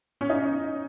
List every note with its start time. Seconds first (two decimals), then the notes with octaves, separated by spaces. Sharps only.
0.21 C#4
0.30 D#4